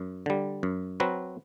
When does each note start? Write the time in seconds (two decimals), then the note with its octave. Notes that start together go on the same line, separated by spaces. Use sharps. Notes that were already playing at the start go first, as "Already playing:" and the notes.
Already playing: F#2
0.26 D3 G3
0.63 F#2
1.00 F#3 C4 F#4 B4